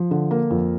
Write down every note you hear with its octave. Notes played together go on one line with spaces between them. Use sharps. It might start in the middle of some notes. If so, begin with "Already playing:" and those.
Already playing: F3
D3
A#3
F2